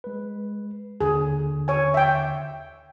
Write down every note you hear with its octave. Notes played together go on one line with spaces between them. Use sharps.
G#3 B4
D#2 D3 G#4
C#5 G#5
E5 G5